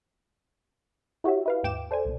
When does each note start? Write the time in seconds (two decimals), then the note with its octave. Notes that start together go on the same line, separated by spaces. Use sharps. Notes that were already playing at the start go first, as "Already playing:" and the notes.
1.24 E4 F#4 G4 C#5 E5
1.46 E4 B4 F5
1.63 D#2 G#2 G5 D6 E7
1.91 A4 C5 D5 G#5
2.05 C2 B2